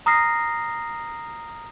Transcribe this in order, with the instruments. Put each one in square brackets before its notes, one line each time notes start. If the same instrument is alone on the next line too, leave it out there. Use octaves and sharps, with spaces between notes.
[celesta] A#5 D#6 F6 A#6 C7